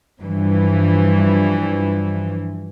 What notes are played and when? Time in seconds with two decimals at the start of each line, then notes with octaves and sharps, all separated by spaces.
0.22 G2 E3 F3